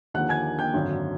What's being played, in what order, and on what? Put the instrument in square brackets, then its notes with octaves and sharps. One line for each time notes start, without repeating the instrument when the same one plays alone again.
[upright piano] D#2 D3 F3 A#3 F#5 F#6
G#5 G#6
G5 G6
G#1 F#2 D3